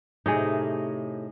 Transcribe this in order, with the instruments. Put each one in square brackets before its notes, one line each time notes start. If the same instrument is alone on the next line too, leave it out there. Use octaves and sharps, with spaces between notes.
[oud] A2 C3 [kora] D#4 G#4